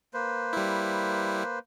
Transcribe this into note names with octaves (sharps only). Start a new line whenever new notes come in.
A#3 B4 C5
G3 E4